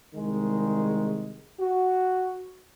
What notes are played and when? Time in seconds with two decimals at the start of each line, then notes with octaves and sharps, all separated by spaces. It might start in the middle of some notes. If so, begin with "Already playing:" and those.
0.15 C2 D#3 G#3
1.60 F#4